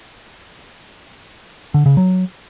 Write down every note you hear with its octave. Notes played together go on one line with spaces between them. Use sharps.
D3
C#3
F#3